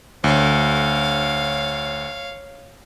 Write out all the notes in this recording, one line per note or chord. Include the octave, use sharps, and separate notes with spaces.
D2 C#5 F5